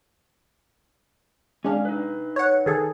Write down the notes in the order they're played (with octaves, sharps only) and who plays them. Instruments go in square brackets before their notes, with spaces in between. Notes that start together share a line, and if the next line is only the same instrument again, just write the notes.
[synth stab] G#3 D4 [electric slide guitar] C#4 F5
[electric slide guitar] D#4 B4
[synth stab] C#5 F#5
D#3 G#4 A4